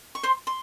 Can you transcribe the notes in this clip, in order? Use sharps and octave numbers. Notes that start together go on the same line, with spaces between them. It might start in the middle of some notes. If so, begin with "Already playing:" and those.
C#6
C5 C6
C6